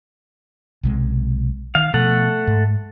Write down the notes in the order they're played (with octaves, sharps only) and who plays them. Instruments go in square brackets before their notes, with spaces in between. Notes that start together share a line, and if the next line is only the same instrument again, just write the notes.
[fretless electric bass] B1 C3 G#3
[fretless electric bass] D#3 [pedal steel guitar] F5
[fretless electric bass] B2 F3 [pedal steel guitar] A3 A4 F#5
[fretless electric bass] G#2